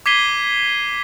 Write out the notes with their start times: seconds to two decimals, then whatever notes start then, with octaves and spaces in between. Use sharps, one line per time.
0.06 D6 G#6 B6 C7 D#7 G7